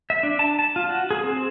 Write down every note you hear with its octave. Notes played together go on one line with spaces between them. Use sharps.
E5
D4
A5
A5
F4
F#4
G#4
C4